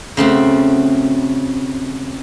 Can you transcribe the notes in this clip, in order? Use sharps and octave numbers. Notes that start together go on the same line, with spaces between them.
C#3 A3 C4 F#4